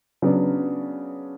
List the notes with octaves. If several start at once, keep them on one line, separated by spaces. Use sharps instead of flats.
C#3 F#3 B3 D4